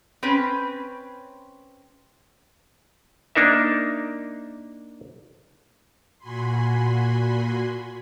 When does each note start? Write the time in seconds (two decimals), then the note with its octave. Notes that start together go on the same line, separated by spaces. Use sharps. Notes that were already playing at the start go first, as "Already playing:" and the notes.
0.23 C4 C#4 B4
3.35 A#3 D4 D#4 A#4 E5
6.18 A#2 F#4 G#5 B5 C6